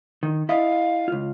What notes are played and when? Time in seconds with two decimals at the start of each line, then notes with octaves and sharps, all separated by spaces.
0.23 D#3
0.49 E4 D#5 F5
1.08 C#2 F4